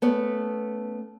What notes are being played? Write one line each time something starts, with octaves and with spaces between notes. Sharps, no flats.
A3 B3 C#4